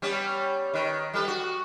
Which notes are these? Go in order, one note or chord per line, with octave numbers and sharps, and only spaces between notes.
G3 B3 C#4
D#3 B4
G3 A4 B4
F#4